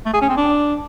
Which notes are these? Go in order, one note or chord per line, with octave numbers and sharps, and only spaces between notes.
A3
G#4
C#4
C4
D4